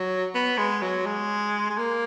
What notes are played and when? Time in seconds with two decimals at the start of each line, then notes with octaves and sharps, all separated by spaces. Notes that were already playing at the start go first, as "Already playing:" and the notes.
Already playing: F#3
0.35 B3
0.58 G#3
0.82 F#3
1.06 G#3
1.70 G#3
1.78 A#3